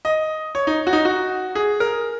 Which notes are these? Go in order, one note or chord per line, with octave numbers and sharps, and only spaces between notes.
D#5
C#5
D#4
F#4
D#4
F#4
G#4
A#4